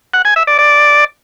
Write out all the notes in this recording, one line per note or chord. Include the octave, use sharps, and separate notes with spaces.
F#5
G#5
E5
D5
D5